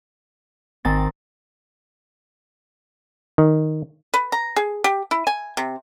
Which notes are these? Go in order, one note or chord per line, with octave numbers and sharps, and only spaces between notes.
G#1 D#3 C4 G#5 A6
D#3
B4
A#5
G#4
G4
E4
G#5
C3